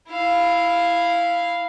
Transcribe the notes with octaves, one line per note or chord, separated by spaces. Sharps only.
E4 F5